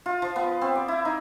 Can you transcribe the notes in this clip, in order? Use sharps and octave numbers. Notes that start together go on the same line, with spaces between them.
F4
F3
B3
C4
D5
E4
D#4